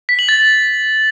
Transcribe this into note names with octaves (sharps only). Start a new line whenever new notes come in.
B6
F#7
A6